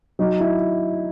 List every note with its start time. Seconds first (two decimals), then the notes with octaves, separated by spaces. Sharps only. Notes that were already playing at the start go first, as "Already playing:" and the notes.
0.19 F#3 D#4
0.40 E4